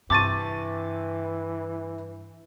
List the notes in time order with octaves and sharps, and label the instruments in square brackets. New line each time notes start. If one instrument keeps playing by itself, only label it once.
[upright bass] G2 [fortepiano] C3 A5 C#6 [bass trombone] E3 [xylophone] D6 A6 D#7